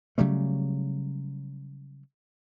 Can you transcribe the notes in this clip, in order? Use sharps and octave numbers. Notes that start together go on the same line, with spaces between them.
C#3 F#3 G3 A3